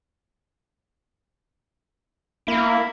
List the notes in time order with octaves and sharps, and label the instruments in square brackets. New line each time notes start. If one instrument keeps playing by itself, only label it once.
[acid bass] A#3 [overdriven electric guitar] E4